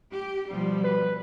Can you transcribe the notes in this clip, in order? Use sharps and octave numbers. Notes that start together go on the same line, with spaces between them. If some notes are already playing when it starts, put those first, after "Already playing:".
G4
B2 F3 G3
B4